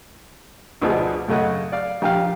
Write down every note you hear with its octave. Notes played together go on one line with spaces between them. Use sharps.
D2 B2 D3 F3 D#4 G#4
F#2 C#3 A3 D#5 F#5
D5 F5
A#1 G4 F5